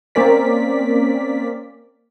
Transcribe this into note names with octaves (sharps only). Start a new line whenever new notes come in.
A#3 C4 C#4 A#4 D5 B6